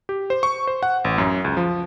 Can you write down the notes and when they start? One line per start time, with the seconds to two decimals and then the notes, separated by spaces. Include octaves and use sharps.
0.09 G4
0.30 C5
0.43 C#6
0.67 C5
0.83 F#5
1.05 A1
1.18 F#2
1.44 C#2
1.57 F3